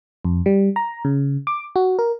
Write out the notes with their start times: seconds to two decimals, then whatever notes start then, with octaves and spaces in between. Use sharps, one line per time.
0.25 F2
0.46 G3
0.76 A#5
1.05 C#3
1.47 D6
1.76 F#4
1.99 A#4